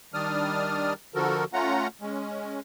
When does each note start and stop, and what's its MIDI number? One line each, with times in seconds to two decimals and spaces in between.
0.14 0.93 51
0.14 0.93 55
0.14 0.93 62
0.14 0.93 74
0.14 0.93 87
0.14 0.93 89
1.15 1.44 50
1.15 1.44 53
1.15 1.44 66
1.15 1.44 69
1.15 1.44 70
1.53 1.87 57
1.53 1.87 61
1.53 1.87 65
1.53 1.87 78
1.53 1.87 82
2.01 2.60 56
2.01 2.60 61